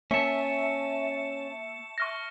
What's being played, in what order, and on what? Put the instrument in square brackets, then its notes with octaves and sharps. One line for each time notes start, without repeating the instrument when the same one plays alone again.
[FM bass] A#3 [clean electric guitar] C#4 [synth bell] E5 A5 [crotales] C#6 C#7 E7
[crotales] C#6 F6 A#6